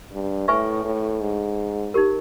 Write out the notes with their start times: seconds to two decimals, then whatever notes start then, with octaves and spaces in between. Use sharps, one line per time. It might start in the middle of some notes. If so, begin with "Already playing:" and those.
0.12 G2
0.48 A2 B4 E5 G#5 C#6
0.85 A2
1.21 G#2
1.94 D#4 G4 A#4